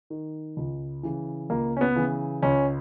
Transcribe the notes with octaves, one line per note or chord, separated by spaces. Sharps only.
D#3
C#2
C#3 E3
C#2 A#3
C#4
B3
C#3 E3
C#2 C#4